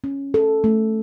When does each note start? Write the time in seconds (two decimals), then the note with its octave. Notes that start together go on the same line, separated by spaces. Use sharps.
0.04 C#4
0.34 A4
0.64 A3